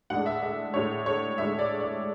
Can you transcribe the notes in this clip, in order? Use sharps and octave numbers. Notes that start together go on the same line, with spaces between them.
A2 G#3 D4 F#5
E5
E5
A2 G#3 D4 C#5
C#5
A2 G#3 D4 E5
D5
D5